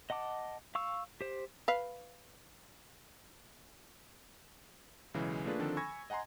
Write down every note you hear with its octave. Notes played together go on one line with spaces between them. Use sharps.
D#5 F#5 A5 D6
F5 C#6 E6
G4 C5
B4 F5
B1 C#3 E3 G#3
A3 A#3 D4 F4 G#4 B4
D3 D#3 F3 C4 D4 A4
G#5 B5 C#6 E6 G#6 A#6
D#5 F#5 G#5 A#5 C6